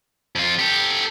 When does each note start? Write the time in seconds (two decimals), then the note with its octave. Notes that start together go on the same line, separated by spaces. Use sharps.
0.36 F2 F4
0.59 G4 A4